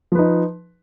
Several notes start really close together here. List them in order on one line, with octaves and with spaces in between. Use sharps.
F3 B4 D#4